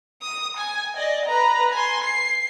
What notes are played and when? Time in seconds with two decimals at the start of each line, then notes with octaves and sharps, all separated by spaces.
0.22 D#6
0.57 G#5
0.97 D5 D#5
1.26 B4 A#5
1.73 G#5 C6
2.04 C7